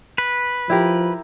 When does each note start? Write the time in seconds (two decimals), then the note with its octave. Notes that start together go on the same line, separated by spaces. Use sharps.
0.18 B4
0.70 F3 E4 G4 A#4